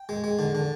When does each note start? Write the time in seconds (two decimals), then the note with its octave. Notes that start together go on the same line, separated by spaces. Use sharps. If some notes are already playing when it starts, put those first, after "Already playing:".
Already playing: G5
0.09 G#3
0.24 G#3
0.39 D3
0.55 D3